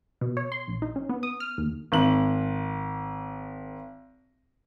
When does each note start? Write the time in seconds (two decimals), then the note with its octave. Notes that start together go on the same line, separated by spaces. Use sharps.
0.21 B2
0.37 C#5
0.52 C6
0.68 A#1
0.82 D#4
0.96 C#4
1.09 B3
1.23 D#6
1.40 F6
1.58 D#2
1.92 G#1 F#7